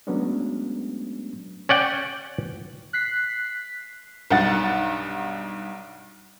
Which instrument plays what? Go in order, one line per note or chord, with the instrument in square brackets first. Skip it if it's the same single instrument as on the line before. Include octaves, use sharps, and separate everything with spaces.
[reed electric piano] F#3 G#3 A3 B3 C#4 D4
[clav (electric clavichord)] C#4 D5 F#5 G5
[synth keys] F#6 B6 C7
[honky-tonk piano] B1 G2 D#4 F#5 A6